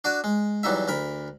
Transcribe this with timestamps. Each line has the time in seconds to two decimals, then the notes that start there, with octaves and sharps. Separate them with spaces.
0.04 D4 F#4 D5
0.24 G#3
0.63 E2 F#3 G3 D#4 E5
0.88 D2 A#4 B5